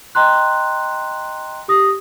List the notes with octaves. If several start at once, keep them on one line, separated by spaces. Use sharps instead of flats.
D#5 G5 A#5 C6 F#6
G4 D#6 A#6